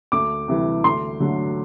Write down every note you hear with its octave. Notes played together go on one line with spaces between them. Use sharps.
D2 D6
C3 E3 G3
D2 C6
D3 F#3 A3